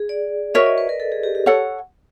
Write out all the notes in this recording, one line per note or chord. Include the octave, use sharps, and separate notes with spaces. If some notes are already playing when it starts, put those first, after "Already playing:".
Already playing: G#4
D5
F#4 A#4 C#5 D#5 E5
D5
B4
A#4
A4
G#4
G4
G4
A4 C#5 F#5